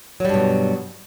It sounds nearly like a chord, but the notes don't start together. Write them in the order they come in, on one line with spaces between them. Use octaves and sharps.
F#3 G3 G2 B2